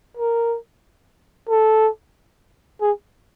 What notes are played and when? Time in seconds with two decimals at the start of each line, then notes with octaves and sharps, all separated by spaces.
0.17 A#4
1.49 A4
2.81 G#4